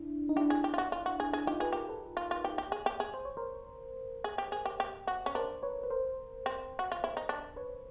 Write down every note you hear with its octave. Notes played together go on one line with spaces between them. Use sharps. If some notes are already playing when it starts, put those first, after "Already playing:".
Already playing: D4 E4
D#4
D4 E4 G4
G#4
G4
F4
F#4
F4
F#4
G#4
G#4
D#4 F4 G4
G#4 A4 B4
G4 G#4 A#4
A4 B4
F4
F4
G4
G4
G#4
G4
G#4
C5
C#5
A#4 C5
G#4
G4
G#4
G4
G4
F#4
C#4
D4 A#4 C5
B4 C#5
B4
A#4 C5
C4
F#4
F4
E4
D#4
D4
B4 C#5